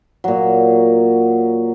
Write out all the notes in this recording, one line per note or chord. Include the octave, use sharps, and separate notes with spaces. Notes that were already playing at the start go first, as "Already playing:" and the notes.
A#2 F#3